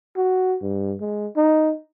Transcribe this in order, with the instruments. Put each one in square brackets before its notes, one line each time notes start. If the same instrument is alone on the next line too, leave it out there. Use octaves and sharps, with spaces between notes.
[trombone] F#4
G2
G#3
D#4